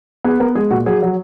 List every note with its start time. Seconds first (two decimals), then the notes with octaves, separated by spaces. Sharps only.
0.24 B3 G#4
0.40 B3 A#4
0.55 G#3 G#4
0.70 A#2 F#4
0.86 F#3 G#4
1.02 F#3